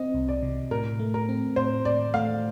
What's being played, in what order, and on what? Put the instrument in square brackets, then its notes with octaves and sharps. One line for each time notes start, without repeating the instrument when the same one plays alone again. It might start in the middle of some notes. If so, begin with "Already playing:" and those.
Already playing: [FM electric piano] C4 [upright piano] D#5
[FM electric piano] C2
[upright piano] D5
[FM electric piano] C3
[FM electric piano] A2 [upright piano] A#4
[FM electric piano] A3
[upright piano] A#4
[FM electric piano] C4
[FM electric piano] A2 [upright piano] C5
[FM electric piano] A2 [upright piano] D5
[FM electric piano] A3 [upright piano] F5